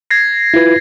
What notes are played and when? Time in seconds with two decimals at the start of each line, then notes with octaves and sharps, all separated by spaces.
0.11 G#6 A#6 C7
0.54 E4 F4 B4